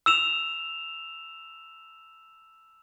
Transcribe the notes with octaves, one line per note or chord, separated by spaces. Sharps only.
E6 E7 F7